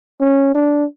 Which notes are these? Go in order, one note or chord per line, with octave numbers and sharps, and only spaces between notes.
C#4
D4